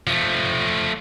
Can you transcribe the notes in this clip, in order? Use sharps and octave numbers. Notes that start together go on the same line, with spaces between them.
F3 A3